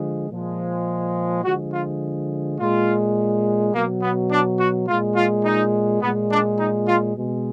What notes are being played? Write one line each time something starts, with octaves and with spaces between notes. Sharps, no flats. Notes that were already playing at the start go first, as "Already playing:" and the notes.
Already playing: D3 F3 G#3
A#2 F3 G#3
D3 F3 G#3 F#4
F4
A#2 G#3 F4
B2 F#3 A#3
B3
D4
F#4
A#2 G#3 F4
F4
D#4
A#2 G#3 B3
D4
D#4
F4
B2 G#3